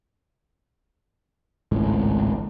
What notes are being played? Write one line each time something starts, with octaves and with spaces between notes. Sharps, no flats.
G#1 C#2 A2